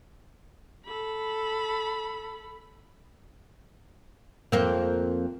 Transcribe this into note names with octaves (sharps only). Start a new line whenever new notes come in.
A4 B5
F2 A#3 C4